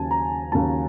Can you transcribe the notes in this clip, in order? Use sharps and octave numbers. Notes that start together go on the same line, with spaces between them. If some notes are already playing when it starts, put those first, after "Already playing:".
Already playing: D#2 C#3 F#3 G#5 A5
A#5
D#2 C#3 F#3 A5